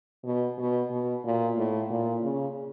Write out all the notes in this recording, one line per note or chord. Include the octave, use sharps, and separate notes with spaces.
B2
B2
B2
A#2
A2
A#2
C#3